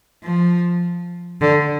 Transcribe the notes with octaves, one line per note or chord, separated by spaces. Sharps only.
F3
D3